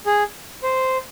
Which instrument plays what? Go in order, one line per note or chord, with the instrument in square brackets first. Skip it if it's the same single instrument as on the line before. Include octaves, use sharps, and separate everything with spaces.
[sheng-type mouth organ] G#4
C5